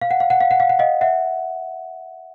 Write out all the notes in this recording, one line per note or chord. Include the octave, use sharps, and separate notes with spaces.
F5
F#5
F5
F#5
F5
F#5
F5
F#5
D#5 F5
E5 F#5